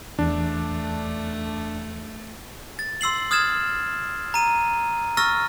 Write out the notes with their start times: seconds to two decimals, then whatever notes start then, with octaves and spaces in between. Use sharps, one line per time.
0.19 E2 A3 D4
2.79 A6
3.01 C6 E6 C7 F#7
3.31 D#6 F6 G#6 A6 E7
4.34 A#5 D#7
5.17 C#6 E6 F6 A6 A#6